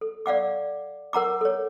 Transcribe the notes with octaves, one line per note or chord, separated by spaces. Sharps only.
A4
D5 F5 F#5 D6
A#4 F#5 A#5 D6
A4 C#5